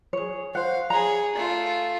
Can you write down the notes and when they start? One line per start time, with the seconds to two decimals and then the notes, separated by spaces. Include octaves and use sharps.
0.13 G#4 C#5
0.55 C5 F5 F#5
0.90 G#4 C#5 A#5
1.36 A3 F4